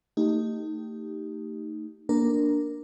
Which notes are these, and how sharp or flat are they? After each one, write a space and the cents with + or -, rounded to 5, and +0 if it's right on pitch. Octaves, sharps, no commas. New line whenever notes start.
A3 +35 D#4 +5 G4 -5
A#3 +15 D4 +0 A#4 +0